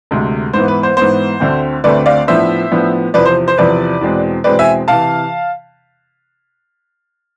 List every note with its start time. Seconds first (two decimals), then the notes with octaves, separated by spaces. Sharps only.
0.11 D2 C3 G#3
0.53 G#2 E3 B3 C5
0.68 B4
0.83 C5
0.97 G#2 E3 B3 C5
1.40 D2 D3 A3 C4
1.84 D2 D3 A3 C4 B4 D5
2.06 D5 F5
2.27 A2 F3 B3 D4 C5 E5
2.71 A2 F3 B3 D4
3.14 E2 C3 F3 B4 D5
3.26 C5
3.48 C5
3.58 E2 C3 F3 B4 D5
4.01 E2 B2 G#3 C4
4.44 E2 B2 G#3 C4 B4 D5
4.59 E5 G#5
4.88 C3 E3 F5 A5